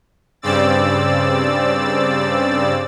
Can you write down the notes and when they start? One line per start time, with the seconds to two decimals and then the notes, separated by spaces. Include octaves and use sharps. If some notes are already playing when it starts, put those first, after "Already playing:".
0.42 G2 C#3 C4 D5 E6 A6